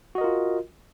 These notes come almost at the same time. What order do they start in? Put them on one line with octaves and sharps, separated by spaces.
F#4 D#5 A#4 F4